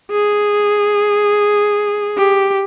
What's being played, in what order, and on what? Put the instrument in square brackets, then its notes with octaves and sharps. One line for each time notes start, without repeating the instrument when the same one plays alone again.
[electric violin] G#4
G4